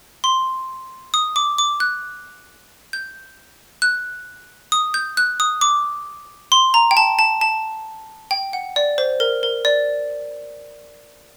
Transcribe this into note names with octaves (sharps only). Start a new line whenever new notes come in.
C6
D#6
D6
D6
F#6
G6
F#6
D#6
G6
F#6
D#6
D6
C6
A#5
G5
A5
A5
A5
G5
F#5
D5
C5
A#4
A#4
D5